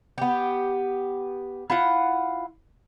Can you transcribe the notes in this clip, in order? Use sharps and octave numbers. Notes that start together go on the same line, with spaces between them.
B3 G4
E4 F4 F#5